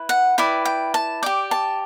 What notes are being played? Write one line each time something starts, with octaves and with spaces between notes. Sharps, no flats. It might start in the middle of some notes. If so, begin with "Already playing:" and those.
Already playing: E4 B4
F#5
E4 B4 D5 G5
G5
A5
G4 D5 G5
A5